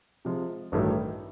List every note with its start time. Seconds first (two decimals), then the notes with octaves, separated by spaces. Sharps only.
0.25 C3 F3 G#3
0.72 A1 G2 D#3 F#3 A3